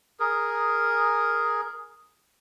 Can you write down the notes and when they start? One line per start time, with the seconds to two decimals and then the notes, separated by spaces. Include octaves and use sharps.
0.20 G#4 A#4